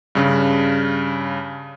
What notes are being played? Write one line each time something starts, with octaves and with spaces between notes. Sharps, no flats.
G2 C#3